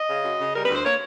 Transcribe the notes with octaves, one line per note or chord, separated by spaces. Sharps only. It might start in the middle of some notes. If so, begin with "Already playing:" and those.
Already playing: D#5
C#3
F#2
C#3
G3 A#4
B4
D2
C5
A#3 C#5